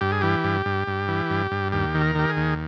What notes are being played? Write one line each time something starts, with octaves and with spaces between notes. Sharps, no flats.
G2 G4
G#4
E3 G4
G2
G2
G2
E3
G2
G2
D#2 G4
D#3
A#4
D#3 G4
G#4
D#2